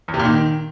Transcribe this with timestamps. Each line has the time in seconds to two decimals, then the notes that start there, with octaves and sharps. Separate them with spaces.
0.08 E2
0.14 C3
0.19 A#2
0.25 D#3